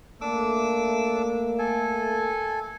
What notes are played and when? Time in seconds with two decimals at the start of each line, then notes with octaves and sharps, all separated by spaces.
0.21 A3 A#3 D4 D6 E6
1.59 A4 G#5